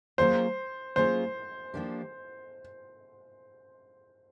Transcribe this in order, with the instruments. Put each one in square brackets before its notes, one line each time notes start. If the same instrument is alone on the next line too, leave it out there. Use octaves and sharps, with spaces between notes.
[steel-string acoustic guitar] F#3 A#3 C#4 F4 G#4 [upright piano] C5
[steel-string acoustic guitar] F#3 A#3 C#4 F4 G#4 [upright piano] C5
[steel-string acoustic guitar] F3 A#3 D4 G4